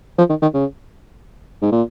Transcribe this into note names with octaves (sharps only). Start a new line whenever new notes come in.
F3
D#3
D#3
C#3
G#2
A#2